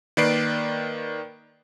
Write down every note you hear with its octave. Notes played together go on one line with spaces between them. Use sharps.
D#3 A#3 B4 D5 C7 D7